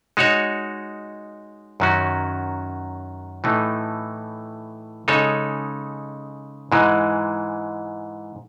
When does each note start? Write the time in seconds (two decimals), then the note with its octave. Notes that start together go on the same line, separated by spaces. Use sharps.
0.17 G#3 D#4 F#4 C#5
1.80 F#2 D#3 F#3 C#4 F#4
3.44 A2 E3 A3 D#4
5.08 C#3 G#3 D#4 A4 C#5
6.72 G#2 E3 G#3